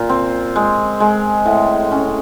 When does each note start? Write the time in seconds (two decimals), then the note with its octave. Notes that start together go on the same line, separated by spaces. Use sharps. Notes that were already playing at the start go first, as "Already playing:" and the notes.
Already playing: A#2
0.09 C4
0.56 G#3
1.00 G#3
1.46 A2
1.91 C#4